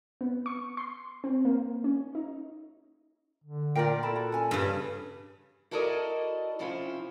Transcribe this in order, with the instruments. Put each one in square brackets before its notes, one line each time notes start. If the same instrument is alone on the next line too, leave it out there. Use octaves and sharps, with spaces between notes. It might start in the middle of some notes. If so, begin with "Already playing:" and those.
[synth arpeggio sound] B3
C#6
C6
C4
A#3
C#4
D#4
[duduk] D3
[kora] A#2 A#4 D5 [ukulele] G5
[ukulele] E4 A5 B5 [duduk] A4
[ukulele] F#4
C#4 G#5
[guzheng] G2 C#3 [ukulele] B4
[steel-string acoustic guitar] E4 F#4 A4 A#4 D5 D#5
C3 F3 C#4 E4 F4